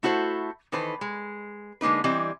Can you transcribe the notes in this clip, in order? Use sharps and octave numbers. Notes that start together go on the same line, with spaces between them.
A3 E4 F#4 A4 C5 E5
D#3 E3 A4 B4 C5
G#3
D3 G#3 A#3 D#4 B4
E3 G3 C4 D#5